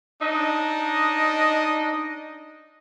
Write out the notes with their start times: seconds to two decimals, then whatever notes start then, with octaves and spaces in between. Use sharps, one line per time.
0.21 D4 D#4 D#5